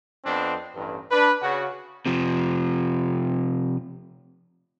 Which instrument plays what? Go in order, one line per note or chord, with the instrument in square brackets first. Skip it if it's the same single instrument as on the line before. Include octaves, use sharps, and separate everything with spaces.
[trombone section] F2 B3 C4 D4
A1 G2
D4 B4
C#3 F#4
[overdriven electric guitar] C3 F3